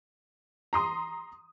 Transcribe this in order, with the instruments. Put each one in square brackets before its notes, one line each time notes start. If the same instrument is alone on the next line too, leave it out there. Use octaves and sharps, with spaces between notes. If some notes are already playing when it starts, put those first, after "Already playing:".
[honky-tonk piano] A#5 C6 D#6